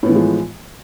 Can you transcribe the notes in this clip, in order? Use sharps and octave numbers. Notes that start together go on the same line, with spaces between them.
A2 E3 F3 G#3 B3